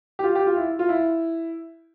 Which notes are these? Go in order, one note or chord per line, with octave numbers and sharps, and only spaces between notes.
G4
F4
G4
F4
E4
F4
E4